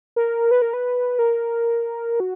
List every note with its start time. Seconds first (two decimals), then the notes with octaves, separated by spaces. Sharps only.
0.16 A#4
0.51 B4
0.62 A#4
0.73 B4
1.19 A#4
2.20 F#4